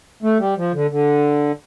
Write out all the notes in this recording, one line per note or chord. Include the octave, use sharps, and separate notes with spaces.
A3
G3
F3
D3
D3